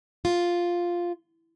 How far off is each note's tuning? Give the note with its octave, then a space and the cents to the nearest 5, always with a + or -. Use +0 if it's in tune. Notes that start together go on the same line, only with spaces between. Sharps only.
F4 +0